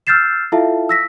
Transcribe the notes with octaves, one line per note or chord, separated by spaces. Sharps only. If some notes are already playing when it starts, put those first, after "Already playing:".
E6 F6 G6 A6 C7 E7
E4 F4 A4 E5 F5 A5
E6 A#6 B6